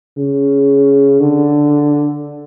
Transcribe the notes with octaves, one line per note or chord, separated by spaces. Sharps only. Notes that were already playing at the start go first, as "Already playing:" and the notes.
C#3
D3